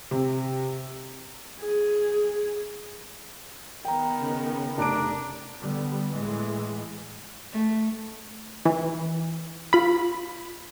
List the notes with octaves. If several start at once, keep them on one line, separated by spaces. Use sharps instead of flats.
C3
G#4
D#3 B3 G5 A#5
C#3
F1 D4 A#5 D7
D3 G3 B3
A2 E3 G#3
A3
E3
F4 B5